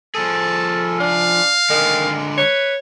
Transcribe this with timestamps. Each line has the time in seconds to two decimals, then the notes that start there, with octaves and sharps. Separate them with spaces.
0.15 F3 G#4 A4 A5
1.00 D4 F5
1.70 D3 D#3 G#3
2.38 B4 C#5